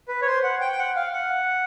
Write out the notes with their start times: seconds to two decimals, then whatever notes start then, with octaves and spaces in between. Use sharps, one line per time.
0.08 B4
0.22 C#5
0.26 C5
0.43 F#5
0.61 G5
0.72 G5
0.79 F#5
0.96 F5
1.13 F#5